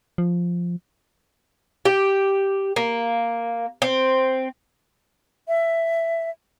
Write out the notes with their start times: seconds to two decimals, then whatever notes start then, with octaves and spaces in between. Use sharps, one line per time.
0.18 F3
1.85 G4
2.76 A#3
3.82 C4
5.48 E5